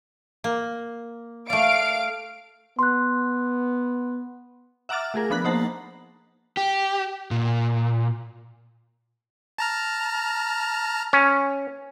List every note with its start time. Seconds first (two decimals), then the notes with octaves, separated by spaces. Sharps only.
0.44 A#3
1.50 A3 D5 F5 D7
2.79 B3 C6 F#6
4.89 E5 F#5 A#5 D6 F6 A6
5.01 E6
5.14 A3 F4 G#4 A#4
5.30 F3 B3 D4 B5 F#6
5.44 A#3 D#4 C5 F#5 A5 A#5
6.57 G4
7.31 A#2
9.58 A5 A#5 F6
11.13 C#4